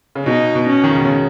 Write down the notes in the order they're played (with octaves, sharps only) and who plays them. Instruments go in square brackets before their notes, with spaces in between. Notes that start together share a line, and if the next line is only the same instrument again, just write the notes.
[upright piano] C#3
[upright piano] B2 [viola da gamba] D#4
[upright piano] B2
[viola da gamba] C#4
[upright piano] D#3
C#3
B2
C#3